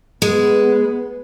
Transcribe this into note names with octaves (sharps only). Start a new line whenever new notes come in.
G#3 B3